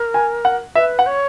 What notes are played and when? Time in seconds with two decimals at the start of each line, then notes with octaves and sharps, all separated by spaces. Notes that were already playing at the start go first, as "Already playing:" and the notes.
Already playing: A#4
0.14 G#5
0.45 F#5
0.75 B4 E5
0.99 F#5
1.06 C#5